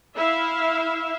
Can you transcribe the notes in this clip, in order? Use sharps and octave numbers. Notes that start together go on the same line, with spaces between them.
E4 E5 F5